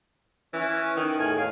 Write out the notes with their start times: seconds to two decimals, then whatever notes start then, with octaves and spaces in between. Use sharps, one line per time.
0.53 E3 C#4
0.96 D#3
1.19 E2 A2 G#5
1.38 A2 C#5 F5